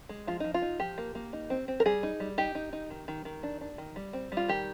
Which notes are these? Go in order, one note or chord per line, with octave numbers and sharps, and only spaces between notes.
G#3
F3 F4
F3 D#4
F4
D#4
F3 G4
A#3
A#3
D#4
C4
C4
A#4
G3 G#4
D#4
G3
D#4 G4
D#4
D#4
D#3
D#3
D#3
D4
D4
D#3
G3
C4
G3
F4
D#3 G4